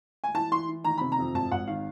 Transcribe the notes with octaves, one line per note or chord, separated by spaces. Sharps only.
G#5
E3 A5
E3 C6
E3
D#3 A#5
C3 B5
A#5
F2
G#1 A5
G#1 F#5
D#3 F5